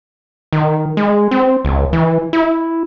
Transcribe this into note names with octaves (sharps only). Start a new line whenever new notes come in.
D#3
G#3
C4
C#2
E3
E4